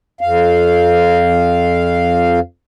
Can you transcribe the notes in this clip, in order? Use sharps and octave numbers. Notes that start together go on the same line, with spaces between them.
F2 F5